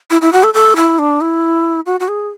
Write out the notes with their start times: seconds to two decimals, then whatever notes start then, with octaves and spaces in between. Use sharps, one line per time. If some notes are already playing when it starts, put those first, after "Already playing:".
0.11 E4
0.21 E4
0.33 F#4
0.44 A4
0.54 A4
0.76 E4
0.99 D4
1.21 E4
1.86 F#4
2.00 F#4
2.08 G#4